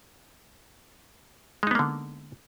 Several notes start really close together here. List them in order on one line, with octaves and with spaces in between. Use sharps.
G#3 D#4 B3 A#3 D3